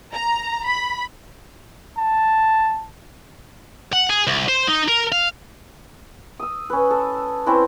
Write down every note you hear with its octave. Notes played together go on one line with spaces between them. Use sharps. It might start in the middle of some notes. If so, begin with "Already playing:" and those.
A#5
B5
A5
F#5
G#4
C2
C5
D#4
A#4
F5
D#6 E6
C#4 B4
A4
C4 C#4 E4 B4